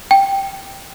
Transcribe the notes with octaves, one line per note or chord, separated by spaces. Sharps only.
G5